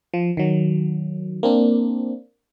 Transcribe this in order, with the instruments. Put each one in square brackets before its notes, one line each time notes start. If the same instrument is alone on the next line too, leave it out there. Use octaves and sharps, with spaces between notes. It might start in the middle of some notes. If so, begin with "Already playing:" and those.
[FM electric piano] F3
D#3 F#3
A#3 C4 D4